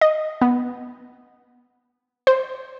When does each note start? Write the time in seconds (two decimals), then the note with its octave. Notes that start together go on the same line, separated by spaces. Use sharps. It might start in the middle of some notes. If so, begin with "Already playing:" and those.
0.01 D#5
0.41 B3
2.27 C5